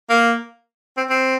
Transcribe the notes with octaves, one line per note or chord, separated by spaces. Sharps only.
A#3
C4
C4